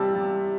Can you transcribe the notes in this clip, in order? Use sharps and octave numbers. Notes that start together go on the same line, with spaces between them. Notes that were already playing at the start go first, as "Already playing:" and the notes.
Already playing: C3 G3 A5 E6
G3